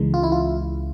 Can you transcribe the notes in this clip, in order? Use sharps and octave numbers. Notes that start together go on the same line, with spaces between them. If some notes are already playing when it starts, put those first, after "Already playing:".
Already playing: C#2 C#3 E3 G#3
F4
E4
F4